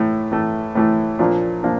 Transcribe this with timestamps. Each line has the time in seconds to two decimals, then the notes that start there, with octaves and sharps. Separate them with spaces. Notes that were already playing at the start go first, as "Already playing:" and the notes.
Already playing: A2 E3 A3
0.32 A2 E3 A3
0.75 A2 E3 A3
1.19 A#2 F3 A#3 D4
1.63 A#2 F3 A#3 D4